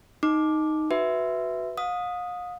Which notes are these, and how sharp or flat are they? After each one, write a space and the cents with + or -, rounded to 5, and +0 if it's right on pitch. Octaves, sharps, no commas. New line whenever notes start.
D#4 +0 D6 +5
F#4 +0 B4 +0 E5 +0
F5 +40 D#6 +0